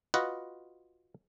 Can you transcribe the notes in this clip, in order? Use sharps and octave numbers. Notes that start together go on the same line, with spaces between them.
F4 F#4 B4 D#5 F#5